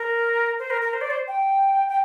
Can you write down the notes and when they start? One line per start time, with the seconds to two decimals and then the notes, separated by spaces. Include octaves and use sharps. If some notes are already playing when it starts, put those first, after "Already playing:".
Already playing: A#4
0.59 C5
0.70 A#4
0.81 A#4
0.93 C5
1.01 D5
1.10 C5
1.27 G5
1.88 G5